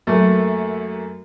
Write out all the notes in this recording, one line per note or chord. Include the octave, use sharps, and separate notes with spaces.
F#2 A3 A#3